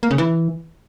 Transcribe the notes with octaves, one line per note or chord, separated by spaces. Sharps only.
A#3
C#3
E3